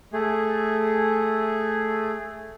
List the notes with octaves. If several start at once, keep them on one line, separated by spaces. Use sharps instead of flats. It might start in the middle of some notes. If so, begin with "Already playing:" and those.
A3 G#4